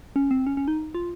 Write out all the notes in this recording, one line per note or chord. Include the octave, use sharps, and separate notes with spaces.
C#4
C4
C#4
C#4
D#4
F4